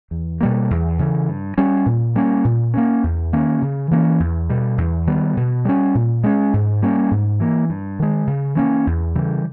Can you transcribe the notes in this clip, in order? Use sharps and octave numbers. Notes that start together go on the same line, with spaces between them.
E2
B2 G3 A#3
E2
C#3 E3
G2
G3 C#4
A#2
G3 A#3 C#4
A#2
A#3 C#4
E2
D#3 A#3 C#4
C#3
E3 A#3 C#4
E2
B2 G3
E2
D#3 G3 B3
B2
G3 C#4
A#2
G#3 C#4
G#2
G3 A#3 C#4
G#2
E3 A#3
G2
D#3 G#3
C#3
E3 A#3 C#4
E2
C#3 E3 G3